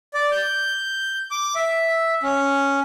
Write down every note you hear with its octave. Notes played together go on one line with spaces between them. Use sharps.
D5
G6
D6
E5
C#4